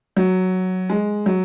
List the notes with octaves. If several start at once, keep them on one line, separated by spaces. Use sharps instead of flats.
F#3
G#3
F#3